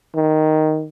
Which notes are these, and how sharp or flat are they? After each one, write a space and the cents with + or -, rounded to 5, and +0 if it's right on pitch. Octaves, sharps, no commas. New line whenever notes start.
D#3 +0